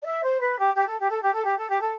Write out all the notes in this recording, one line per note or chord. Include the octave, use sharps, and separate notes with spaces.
D5
E5
C5
B4
G4
G4
A4
G4
A4
G4
A4
G4
A4
G4
A4